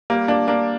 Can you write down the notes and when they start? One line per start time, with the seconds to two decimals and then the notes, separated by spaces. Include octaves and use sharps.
0.10 G3 A#3
0.28 A#3 D4
0.48 A#3 D4